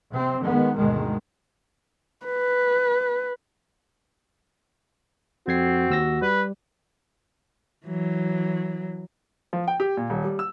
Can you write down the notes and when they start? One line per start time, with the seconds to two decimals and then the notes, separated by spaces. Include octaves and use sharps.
0.11 C3 C4
0.42 D#3 G#3 B3
0.77 D2 G2 B2 D#3 G#3
2.26 B4
5.48 F2 C4 F#4 G#6 C7
5.90 D#2 E6 A#6
6.22 G3 B4
7.86 E3 F#3
9.53 F3
9.68 G5
9.80 G4
9.97 A#2
10.10 D#1
10.25 G3
10.39 E6